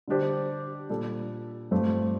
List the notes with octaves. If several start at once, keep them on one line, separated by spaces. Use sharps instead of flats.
D3 G3 D4 G4 C5
A#2 G3 D4 A4
G2 F3 A3 C4 F4